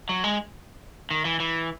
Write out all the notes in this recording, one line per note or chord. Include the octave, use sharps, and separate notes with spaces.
F#3
G#3
D#3
E3
E3